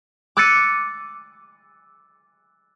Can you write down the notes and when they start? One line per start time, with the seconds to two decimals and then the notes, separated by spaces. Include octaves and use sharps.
0.37 D6 E6 F#6 A6 C#7 D#7